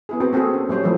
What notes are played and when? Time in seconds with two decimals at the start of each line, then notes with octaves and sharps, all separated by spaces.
0.09 B3 E4 G#4
0.20 C4 F#4 B4
0.33 A#3 C4 F#4 G#4 A4
0.54 C#4
0.69 F#3 G3 A3 C5 C#5
0.83 E3 F3 G3 G#3 E4 A4